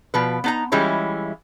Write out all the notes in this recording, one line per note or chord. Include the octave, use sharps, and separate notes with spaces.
B2 F3 B4
B3 D#4 A#5
E3 G3 G#3 C#4 E4 F4